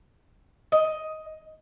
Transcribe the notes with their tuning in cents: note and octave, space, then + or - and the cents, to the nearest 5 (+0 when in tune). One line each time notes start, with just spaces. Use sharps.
D#5 +10